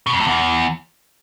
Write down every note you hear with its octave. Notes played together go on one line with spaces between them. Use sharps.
B2
F2
A2
E2